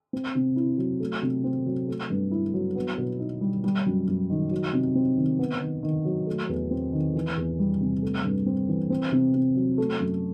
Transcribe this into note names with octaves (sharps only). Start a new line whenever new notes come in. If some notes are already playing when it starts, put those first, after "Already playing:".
C4
C3
E4
F#3
A3
C3
C4
F#3
A3
G2
E4
F#3
B3
B2
D#4
G3
G3
F#2
F#2
D#3
F#3
C3
C4
D#3
B3
D#3
D#3
F#3
A3
E2
C4
D#3
E3
E2
G3
C3
A3
G2
C4
E3
C4
C3
C3
F#3
A3
F#2